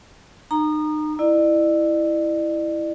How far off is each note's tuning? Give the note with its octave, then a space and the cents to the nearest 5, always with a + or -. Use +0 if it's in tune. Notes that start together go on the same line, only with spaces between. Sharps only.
D#4 -35 A#5 +0
E4 +0 D5 +40